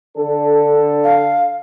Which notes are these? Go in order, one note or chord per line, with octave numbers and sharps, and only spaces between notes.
D3 D4 A4
F5